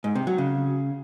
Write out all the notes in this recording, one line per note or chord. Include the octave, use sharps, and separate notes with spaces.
G#2
C3
F#3
C#3